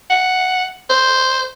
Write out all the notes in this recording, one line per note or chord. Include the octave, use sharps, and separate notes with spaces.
F#5
C5